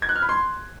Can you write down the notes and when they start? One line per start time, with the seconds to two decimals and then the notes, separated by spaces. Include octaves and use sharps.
0.02 G#6
0.09 F#6
0.16 F6
0.22 B5
0.29 C6